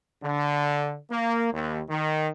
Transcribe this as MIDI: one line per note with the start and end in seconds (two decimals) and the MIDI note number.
0.23 0.96 50
1.11 1.50 58
1.52 1.81 39
1.89 2.28 51